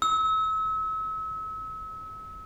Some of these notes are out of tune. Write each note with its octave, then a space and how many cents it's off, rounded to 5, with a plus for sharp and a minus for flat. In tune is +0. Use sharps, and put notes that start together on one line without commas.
E6 -35